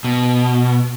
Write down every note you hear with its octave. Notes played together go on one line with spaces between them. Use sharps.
B2